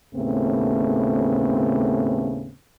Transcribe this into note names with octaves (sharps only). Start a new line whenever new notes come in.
D#2 A2 C#3 A3 B3 C4